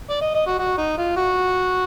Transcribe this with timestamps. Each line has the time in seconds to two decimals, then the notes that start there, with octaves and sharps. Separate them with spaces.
0.10 D5
0.21 D#5
0.34 D#5
0.47 F#4
0.59 F#4
0.78 D#4
0.98 F4
1.17 F#4